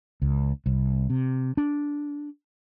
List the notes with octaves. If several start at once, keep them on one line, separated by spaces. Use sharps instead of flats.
C#2
C2
C3
D4